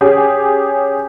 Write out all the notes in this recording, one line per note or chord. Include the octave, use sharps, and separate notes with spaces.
C#4 G4 G#4